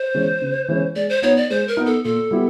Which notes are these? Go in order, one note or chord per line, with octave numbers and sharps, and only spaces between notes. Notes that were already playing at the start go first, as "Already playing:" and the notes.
Already playing: C5
E3 G#3 C#4
C#3
E3 G#3 C#4
G#3 D5
C5
B3 D#4 C#5
D5
G#3 C5
A#4
B3 D#4
A4
A#2 A4
G3 B3 E4 G4